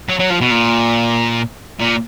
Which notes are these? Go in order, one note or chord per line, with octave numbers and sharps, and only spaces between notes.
F#3
F#3
F3
B2
A#2
A#2